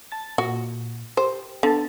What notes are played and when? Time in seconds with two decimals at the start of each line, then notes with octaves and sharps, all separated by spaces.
0.12 A5 A6
0.38 A#2 F#4
1.17 G4 C5
1.63 D3 B3 A5